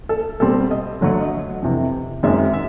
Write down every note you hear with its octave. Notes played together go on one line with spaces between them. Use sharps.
A4
B2 G3 C4 A4
D#5
D3 F#3 A3
D#5
F2 C3 E3
F#2 D#3 G#3 C4 E5
E5